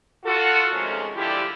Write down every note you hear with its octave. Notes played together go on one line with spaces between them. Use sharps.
F4 F#4 A4
C3 D#3 F3 G#3 A3 C#4
D3 F3 G3 D4 E4 G4